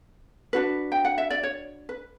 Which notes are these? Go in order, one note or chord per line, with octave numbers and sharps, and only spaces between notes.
D4 F#4 B4
G5
F#5
E5
D5
C#5
B4